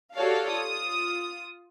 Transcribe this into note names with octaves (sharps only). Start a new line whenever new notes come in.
F#4 G4 A4 C#5 D5 F5
F4 D#6